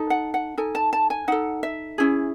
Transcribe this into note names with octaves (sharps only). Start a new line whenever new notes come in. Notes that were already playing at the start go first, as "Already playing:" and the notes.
Already playing: D#4 A4
F#5
F#5
D#4 A4 G#5
A5
A5
G#5
D#4 A4 F#5
E5
C#4 E4 G#4